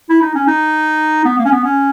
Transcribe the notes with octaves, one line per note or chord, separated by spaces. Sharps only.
E4
D#4
C#4
D#4
B3
A#3
C#4
B3
C#4